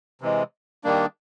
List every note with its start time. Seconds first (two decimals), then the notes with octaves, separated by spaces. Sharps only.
0.21 C3 E3 G#3
0.84 D#3 G3 A#3 D4